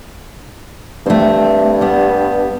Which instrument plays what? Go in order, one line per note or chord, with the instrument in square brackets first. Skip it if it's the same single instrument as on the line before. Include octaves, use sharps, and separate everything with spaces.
[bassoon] G2 [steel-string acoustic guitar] A3 C4
[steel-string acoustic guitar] G3 B3